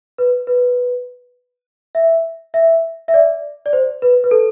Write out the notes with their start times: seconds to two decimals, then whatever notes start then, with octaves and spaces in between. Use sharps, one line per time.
0.18 B4
0.47 B4
1.95 E5
2.54 E5
3.08 E5
3.14 D5
3.66 D5
3.73 C5
4.02 B4
4.24 B4
4.31 A4